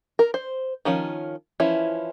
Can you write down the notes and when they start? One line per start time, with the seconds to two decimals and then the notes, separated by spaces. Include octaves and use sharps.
0.19 A#4
0.34 C5
0.85 D#3 F3 C#4
1.60 E3 F3 C#4 E4